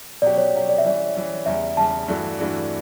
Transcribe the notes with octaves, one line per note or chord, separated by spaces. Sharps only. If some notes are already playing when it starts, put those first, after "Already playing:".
B2 F#3 C#4 G4 D5
C#5
B2 F#3 C#4 G4
D5
E5
E3 G3 C#4 D5
E3 G3 C#4
E2 C#3 G3 E5
E2 C#3 G3 A5
G2 E3 A3 D4 F#4
G2 E3 A3 D4 F#4